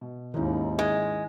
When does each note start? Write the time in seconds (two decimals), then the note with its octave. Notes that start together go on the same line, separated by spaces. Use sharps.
0.01 B2
0.34 D#2 G#2 D#3 C#4 D#4 E4
0.79 G#3